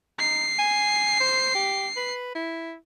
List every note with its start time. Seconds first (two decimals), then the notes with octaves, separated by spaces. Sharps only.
0.20 D#4 C7
0.59 G#5
1.20 C5
1.55 G4
1.97 B4
2.35 E4